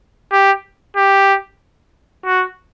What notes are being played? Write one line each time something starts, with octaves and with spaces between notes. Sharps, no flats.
G4
G4
F#4